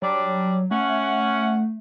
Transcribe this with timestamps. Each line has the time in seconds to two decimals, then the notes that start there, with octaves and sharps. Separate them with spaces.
0.02 F#3 G3 D4 D5
0.71 A3 C#4 F#5